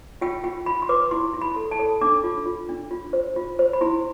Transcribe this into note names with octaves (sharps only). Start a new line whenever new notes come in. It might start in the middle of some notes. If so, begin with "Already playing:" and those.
F4 G5
F4 G5
F4 B5
C6
B4 D6
E4 C6
E4
B5
A4
A5
A4
D4 D6
F4
F4
D4
F4
C5
F4
C5
B5
E4 C6